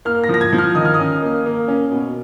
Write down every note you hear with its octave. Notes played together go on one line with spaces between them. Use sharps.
A#3 F6
A#6
F3
A#6
G#6
F3
F6
D#3 D#6
F6
D#6
C#4
A#3
A#3
C#4
B2